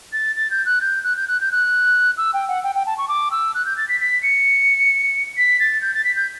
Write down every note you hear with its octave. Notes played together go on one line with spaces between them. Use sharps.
A6
A6
G6
F#6
G6
F#6
G6
F#6
G6
F#6
E6
G5
F#5
G5
G5
A5
C#6
D6
E6
F#6
G6
A6
B6
B6
C#7
B6
A6
G6
A6
B6
G6